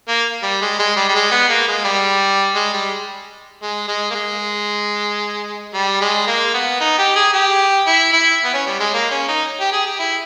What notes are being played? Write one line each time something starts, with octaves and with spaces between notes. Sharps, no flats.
A#3
G3
G#3
G#3
G3
G3
G#3
B3
A#3
G#3
G3
G#3
G3
G#3
G#3
A#3
G#3
G3
G#3
A#3
B3
D#4
G4
G#4
G4
E4
E4
B3
C#4
G3
G#3
A#3
C#4
D#4
G4
G#4
G4
E4